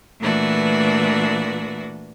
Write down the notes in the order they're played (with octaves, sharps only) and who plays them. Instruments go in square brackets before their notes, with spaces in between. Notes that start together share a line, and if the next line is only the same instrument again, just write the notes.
[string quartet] A#2 E3 A3 D4 F#4 B4